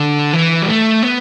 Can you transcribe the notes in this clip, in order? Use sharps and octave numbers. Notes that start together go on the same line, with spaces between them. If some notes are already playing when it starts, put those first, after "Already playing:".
Already playing: D3
E3
G3
A3
B3